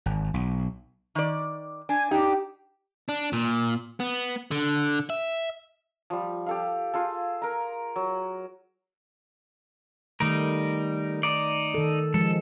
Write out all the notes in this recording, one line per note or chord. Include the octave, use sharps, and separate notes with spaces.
G#1
B1
D#3 D5
D4 G#5
D4 D#4 G4
D4
A#2
B3
D3
E5
F3 G3
G4 A4 F5
F4 G#4 A4
A#4 A#5
F#3
D#3 G3 A3 D#4 A#4
D#4 D5
D#3 A4
F3 G#3 A4